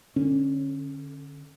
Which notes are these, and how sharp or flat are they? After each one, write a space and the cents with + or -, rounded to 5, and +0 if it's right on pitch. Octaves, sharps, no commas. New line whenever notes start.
D3 +0 C#4 -20